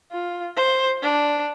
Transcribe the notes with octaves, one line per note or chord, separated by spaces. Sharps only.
F4
C5
D4